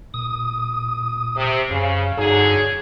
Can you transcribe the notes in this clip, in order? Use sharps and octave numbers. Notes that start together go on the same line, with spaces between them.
A#2 D#6
C3
F#2 C#3 F5
G2 D3 F#3 D#4 G#4